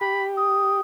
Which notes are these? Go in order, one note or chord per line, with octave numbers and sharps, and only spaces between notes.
G4 B5
D#6